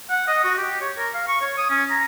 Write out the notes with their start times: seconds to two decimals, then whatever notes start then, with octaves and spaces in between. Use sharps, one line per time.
0.10 F#5
0.27 D#5
0.44 F#4
0.57 G4
0.81 C#5
0.98 A#4
1.14 F5
1.28 C#6
1.41 C#5
1.57 D#6
1.70 C#4
1.90 A#5